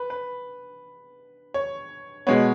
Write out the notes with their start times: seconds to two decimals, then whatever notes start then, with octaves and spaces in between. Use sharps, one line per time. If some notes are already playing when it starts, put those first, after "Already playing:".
Already playing: B4
0.10 B4
1.54 C#5
2.27 B2 G#3 B3 C#5